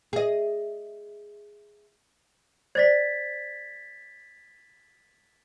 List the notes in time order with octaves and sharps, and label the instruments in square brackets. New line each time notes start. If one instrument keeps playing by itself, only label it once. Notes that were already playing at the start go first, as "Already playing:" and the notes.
[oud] G#4 D#5
[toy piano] C5 D5 [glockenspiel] G#6 A6 B6